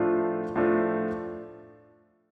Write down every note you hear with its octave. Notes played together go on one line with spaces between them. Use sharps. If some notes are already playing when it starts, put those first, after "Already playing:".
Already playing: A2 F3 A3 D4 F4
A2 F3 A3 D4 F4